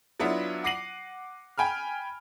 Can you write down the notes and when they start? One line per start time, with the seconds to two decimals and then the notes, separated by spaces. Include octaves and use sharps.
0.20 F#3 B3 D4 E4 F4
0.64 F#5 D6 A#6 C7 D#7 F#7
1.58 G5 G#5 B5 F6